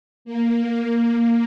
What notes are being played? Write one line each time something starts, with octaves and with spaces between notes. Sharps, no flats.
A#3